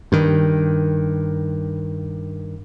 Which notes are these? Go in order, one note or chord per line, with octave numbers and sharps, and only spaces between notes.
G2 D#3